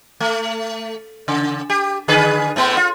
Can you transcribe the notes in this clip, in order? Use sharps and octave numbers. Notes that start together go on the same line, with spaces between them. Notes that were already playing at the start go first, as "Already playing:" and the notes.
A3
C#3
G4
D3 G#4 B4
A2 A3 B3
F4